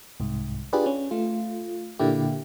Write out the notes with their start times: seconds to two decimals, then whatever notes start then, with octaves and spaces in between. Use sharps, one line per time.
0.20 C2 G#2
0.73 D4 F4 G4 G#4 B4 D5
0.86 C#4
1.11 A3 F4
1.99 A#2 D3 A#3 E4 G4